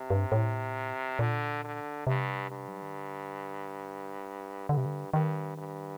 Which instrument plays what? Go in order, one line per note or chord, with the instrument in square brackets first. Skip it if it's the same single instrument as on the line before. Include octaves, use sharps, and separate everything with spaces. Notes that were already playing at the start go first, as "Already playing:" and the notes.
Already playing: [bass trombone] C3
[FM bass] G2
A2
[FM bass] A#2 [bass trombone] D3
[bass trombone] D3
[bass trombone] G2 [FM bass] C3
[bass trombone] G2
[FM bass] F#3
D#3
D3
[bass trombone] G2 [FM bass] D3
[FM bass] C3
D3
[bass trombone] G2 [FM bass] D#3
[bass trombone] G2